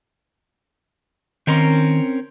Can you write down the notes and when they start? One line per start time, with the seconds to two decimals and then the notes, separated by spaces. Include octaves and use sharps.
1.47 D#3 C4 C#4 A#4 C6